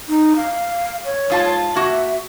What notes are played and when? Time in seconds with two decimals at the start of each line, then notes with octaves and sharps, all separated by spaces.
0.09 D#4
0.36 F5
1.05 C#5
1.30 G#2 F4 A5
1.75 A#3 F#4 E5